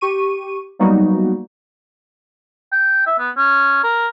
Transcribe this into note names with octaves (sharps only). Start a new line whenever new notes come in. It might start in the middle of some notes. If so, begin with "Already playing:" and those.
G4 C#6 D#7
F#3 G3 A#3 B3 D#4 F#4
G5
E5
B3
C#4
A#4